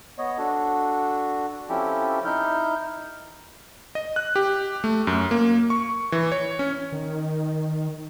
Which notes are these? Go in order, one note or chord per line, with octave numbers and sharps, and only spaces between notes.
B3 C#5 D#5
D4 F#4 A4
F3 C4 C#4 E4 G4 A4
D#4 E4 F6 G6
D#5
F#6
G4
A3
F#2
A#3
C#6
E3
C#5
C#4
D#3